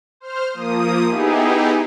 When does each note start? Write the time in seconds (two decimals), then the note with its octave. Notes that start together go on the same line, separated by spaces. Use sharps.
0.20 C5 F6
0.53 F3 A#3 D#6
1.05 B3 D#4 E4 G4 G#4